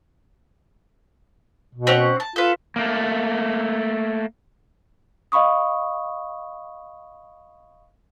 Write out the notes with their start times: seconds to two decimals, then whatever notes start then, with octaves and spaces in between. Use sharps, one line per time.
1.75 B2
1.87 C4 C#4 F#5
2.20 A5
2.36 F4 A4 B4
2.76 A3 A#3
5.32 D#5 F5 B5 C#6 D#6